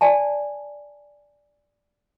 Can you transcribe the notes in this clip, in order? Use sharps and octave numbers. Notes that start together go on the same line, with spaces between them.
D5 G#5 A5